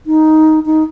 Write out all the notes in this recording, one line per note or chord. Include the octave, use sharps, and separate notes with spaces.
D#4
D#4